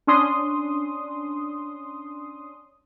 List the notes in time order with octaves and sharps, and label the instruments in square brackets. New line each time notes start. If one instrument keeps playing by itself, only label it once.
[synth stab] C#4 D4 C6 D#6